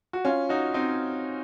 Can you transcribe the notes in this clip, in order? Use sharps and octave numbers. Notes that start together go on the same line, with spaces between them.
F#4
C#4 F4
D#4 F#4
C4 D#4